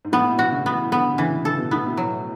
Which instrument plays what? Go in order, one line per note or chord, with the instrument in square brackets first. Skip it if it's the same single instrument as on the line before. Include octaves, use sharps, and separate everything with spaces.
[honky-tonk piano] G#2
[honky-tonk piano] A2 [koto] B3
[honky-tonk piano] B2
[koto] F#4
[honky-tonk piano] C#3
[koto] B3
[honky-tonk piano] E3
[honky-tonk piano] D3 [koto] B3
[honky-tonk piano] D3
[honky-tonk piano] C#3 [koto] E3
[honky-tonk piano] C#3 [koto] A4
[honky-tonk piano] B2
[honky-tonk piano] A2 [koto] B3
[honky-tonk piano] B2
[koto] F#3